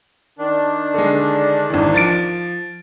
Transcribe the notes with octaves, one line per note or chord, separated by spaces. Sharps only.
D#3 D4
D3 G#3
G#1 E3
F3 A6 D7